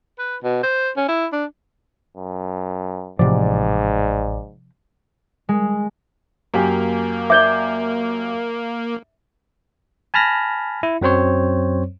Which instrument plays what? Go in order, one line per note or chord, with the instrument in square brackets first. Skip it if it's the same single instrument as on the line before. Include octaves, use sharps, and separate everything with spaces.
[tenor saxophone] B4
B2
C5
C#4
E4
D4
[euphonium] F#2
[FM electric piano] A1 D5 [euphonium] G#2 [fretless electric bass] C3 F3
[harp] G#3
[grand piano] F#2 G4 G#5 [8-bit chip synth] A#3
[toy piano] D5 E5 [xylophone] D6 G6 G7
[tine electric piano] G#5 A5 B5 F6 A#6
E4
F#2 F#3 C4 C5 C#5